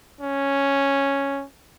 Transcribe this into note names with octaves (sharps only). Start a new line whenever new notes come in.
C#4